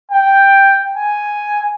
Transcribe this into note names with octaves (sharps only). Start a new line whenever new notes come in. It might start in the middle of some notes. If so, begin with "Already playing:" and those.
G5
G#5